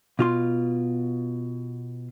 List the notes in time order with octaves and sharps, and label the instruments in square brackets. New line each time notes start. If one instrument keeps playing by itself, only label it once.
[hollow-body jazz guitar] B2 F4 C6